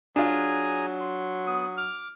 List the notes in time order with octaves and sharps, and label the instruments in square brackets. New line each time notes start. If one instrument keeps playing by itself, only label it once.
[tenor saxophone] F#3 [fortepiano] D4 F4 [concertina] G#4 G#5 A#5
[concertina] C6
[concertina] B3 [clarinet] D#6
[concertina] D6 [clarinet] F6